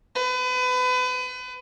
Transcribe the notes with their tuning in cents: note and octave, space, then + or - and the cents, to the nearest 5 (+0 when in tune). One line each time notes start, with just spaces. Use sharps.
B4 +30